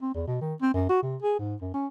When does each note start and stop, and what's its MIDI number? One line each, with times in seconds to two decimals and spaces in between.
0.02 0.13 60
0.14 0.23 40
0.27 0.38 47
0.42 0.54 51
0.61 0.70 60
0.74 0.86 42
0.89 1.02 66
1.03 1.17 48
1.22 1.35 68
1.39 1.55 44
1.61 1.70 42
1.74 1.87 61